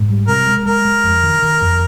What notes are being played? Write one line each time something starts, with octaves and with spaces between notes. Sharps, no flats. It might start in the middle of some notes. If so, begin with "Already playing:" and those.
Already playing: G#2
G3
C3 A#4
G#3
G#3 A#4
G#3
F2
D#3
D#3
F2